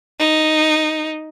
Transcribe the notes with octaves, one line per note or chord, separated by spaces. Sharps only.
D#4